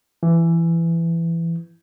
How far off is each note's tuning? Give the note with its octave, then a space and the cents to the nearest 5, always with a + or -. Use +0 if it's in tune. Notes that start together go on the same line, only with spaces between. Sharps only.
E3 +15